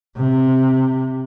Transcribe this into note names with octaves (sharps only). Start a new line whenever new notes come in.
C3